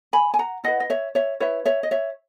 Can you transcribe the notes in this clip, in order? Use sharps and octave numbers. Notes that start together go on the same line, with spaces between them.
G#5 B5
G#5
F#5 A#5
E4 B4 D#5 F#5
D#5
C#5 E5
C#5 E5
E4 B4 C#5 E5
C#5 E5
D#5
C#5 E5